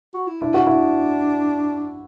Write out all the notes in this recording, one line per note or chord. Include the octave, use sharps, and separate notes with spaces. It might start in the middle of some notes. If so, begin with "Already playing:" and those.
F#4
E4
D4 E4
F#4
E4